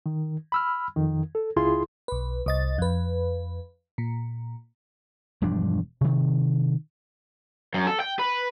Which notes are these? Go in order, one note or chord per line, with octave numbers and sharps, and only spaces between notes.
D#3
B5 E6 F6
F2 D#3
A4
C#2 E4 F4 G#4 C6
B1 B4
C2 D#5 A6
F2 B4
A#2
E1 G2 F3 D4
C3 D#3
F#2
A4
G5
B4